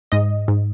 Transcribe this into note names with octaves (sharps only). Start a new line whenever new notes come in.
G#2 D#5
G#2